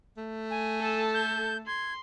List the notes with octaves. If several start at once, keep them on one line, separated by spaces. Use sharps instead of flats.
A3
G#5
A4 A5
G6
C6 G#6